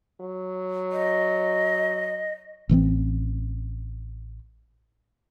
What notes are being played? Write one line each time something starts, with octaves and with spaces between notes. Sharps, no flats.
F#3
D#5
A1 E3 G#3 C4